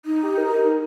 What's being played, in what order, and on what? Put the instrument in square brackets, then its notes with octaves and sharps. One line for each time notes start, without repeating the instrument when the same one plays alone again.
[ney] D#4
[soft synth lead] G4
A#4